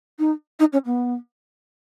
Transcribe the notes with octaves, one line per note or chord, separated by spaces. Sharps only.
D#4
D#4
C#4
B3